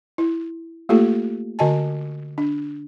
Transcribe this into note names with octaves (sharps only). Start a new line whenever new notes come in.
E4
A3 A#3 F4 G4 A4
D3 F#4 D#5 G#5 A5
D4